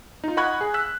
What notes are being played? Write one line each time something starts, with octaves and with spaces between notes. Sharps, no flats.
D#4 F4
D#5 F#5 B5 C#6 F#6 G#6
G#4
E6 F#6 B6